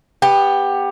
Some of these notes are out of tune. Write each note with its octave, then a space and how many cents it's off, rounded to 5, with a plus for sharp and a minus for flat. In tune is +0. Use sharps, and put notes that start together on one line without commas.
B3 +0 G4 +15